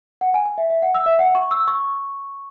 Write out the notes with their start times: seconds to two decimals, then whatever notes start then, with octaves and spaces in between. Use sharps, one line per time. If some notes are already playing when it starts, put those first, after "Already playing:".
0.21 F#5
0.34 G#5
0.46 G#5
0.58 E5
0.70 E5
0.82 F#5
0.95 E6
1.06 E5
1.19 F#5
1.35 C#6
1.51 E6
1.68 C#6